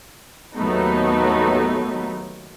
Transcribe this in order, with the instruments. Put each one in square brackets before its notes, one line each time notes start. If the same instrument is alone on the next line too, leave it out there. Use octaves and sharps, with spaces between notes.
[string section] D#2 A2 F#3 A3 B3 D#4